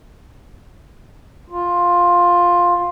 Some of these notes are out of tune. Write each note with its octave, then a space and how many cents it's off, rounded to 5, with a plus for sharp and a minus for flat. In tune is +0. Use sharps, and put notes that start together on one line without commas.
F4 +10